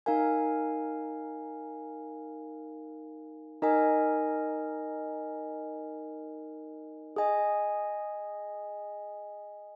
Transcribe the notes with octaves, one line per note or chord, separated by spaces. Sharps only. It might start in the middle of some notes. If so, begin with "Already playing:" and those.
D#4 A#4 F5 G#5
D#4 A#4 D#5 G#5
G#4 D#5 G#5